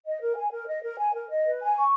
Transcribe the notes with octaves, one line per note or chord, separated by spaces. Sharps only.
D#5
A#4
G#5
A#4
D#5
A#4
G#5
A#4
D#5
B4
G#5
C#6